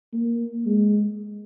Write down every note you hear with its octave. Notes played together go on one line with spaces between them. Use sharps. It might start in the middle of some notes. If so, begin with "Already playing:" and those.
A#3
G#3